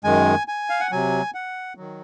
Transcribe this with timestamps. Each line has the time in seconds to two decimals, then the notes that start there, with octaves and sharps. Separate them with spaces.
0.04 F#2 D#3 G#3 G#5
0.48 G#5
0.70 F5
0.80 F#5
0.92 C3 F#3 G#5
1.34 F#5
1.77 D#3 F#3